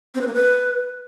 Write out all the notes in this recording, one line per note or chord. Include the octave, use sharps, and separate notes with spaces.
C4
B4
A#3
B4